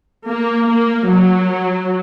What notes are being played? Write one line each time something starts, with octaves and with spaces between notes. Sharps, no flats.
A#3
A#3
F#3